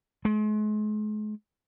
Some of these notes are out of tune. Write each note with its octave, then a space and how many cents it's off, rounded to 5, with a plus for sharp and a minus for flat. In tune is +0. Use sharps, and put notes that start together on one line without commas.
G#3 +40